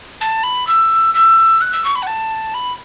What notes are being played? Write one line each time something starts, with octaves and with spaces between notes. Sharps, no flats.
A5
B5
E6
E6
F#6
E6
C#6
B5
F#5
A5
B5